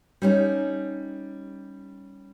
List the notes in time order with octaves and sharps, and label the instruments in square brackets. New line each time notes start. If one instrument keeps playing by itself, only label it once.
[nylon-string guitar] G3 C#4 D#4